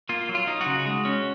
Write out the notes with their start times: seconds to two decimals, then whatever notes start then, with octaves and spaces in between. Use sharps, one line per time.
0.09 A#3 F4
0.29 F#3
0.35 F4
0.47 D#4
0.61 F#4
0.66 C#3
0.86 G#3
1.05 C#4